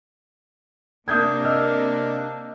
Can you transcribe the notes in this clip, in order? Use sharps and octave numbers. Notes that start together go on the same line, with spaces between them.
C3 A#3 D4 D#6 G6 G#6
D#5 E6 F6